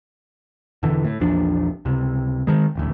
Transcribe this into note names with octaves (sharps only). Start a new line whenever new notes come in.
E1 D3 E3
A2
A#1 E2 F3 D4
C#2 C3
D#3 G#3
D#1 A1 D2